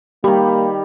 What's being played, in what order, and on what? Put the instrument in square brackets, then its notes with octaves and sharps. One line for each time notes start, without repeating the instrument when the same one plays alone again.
[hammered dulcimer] D#3 G3 [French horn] A#3 [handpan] G4